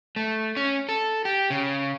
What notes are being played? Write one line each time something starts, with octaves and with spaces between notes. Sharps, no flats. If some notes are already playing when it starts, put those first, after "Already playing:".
A3
C#4
A4
G4
C#3